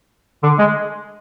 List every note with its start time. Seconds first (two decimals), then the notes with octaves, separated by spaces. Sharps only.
0.43 D3
0.59 G#3